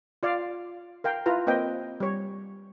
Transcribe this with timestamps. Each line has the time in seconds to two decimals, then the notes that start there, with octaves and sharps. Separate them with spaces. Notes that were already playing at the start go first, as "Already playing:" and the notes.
0.23 F4 D5 F5
1.04 A#4 F5 G5
1.26 E4 F4 B4 A#5
1.47 A#3 C4 B4 D#5 G5
2.00 G3 C#5